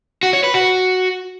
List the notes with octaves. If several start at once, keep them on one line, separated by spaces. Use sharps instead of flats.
F#4
C#5
B4
F#4